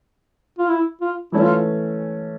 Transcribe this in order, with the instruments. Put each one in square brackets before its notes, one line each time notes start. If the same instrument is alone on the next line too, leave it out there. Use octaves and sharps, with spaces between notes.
[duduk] F4
E4
F4
[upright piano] E3 A3 C#4 [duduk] E4
[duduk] F4